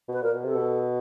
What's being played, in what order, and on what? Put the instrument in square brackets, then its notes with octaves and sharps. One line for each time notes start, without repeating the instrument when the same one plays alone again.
[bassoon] B2 [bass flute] B4
[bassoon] A#2 [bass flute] A#4
[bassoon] B2
[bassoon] C3 [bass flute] A4
[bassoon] B2